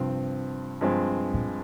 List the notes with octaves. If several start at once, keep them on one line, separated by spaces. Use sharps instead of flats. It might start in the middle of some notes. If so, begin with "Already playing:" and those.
Already playing: G2 C3 F3 C4
G2 F3 G#3 C4
A#2